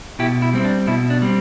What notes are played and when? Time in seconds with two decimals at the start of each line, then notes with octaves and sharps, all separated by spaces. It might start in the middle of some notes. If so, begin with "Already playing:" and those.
0.19 B2 E4 G4
0.42 E4
0.53 G3 C4
0.64 D4
0.87 B2 E4
1.10 D4
1.22 G3 C4